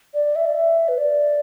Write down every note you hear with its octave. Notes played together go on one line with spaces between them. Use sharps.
D5
E5
D5
E5
B4
D5